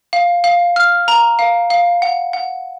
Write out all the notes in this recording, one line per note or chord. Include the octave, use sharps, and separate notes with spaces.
F5
F5
F6
A#5
F5
F5
F#5
F#5